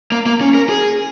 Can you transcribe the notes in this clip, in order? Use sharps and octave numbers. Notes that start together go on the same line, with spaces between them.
A#3
A#3
C#4
A#4
G#4